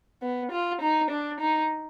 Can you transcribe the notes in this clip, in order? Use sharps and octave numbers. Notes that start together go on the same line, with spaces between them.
B3
F4
D#4
D4
D#4